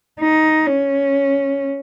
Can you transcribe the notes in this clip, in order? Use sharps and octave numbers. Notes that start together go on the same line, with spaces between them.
D#4
C#4